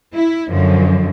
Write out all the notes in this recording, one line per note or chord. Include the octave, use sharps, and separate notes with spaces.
E4
F#2 D3 F3